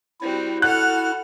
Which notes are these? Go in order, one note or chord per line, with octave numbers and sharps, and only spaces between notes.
G3 C4 E4 F#4
F#4 A4 F#5 F6 F#6